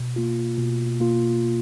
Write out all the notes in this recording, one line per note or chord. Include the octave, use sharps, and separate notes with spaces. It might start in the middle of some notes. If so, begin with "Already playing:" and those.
Already playing: B2
A#3 F4
B2
A#3 F4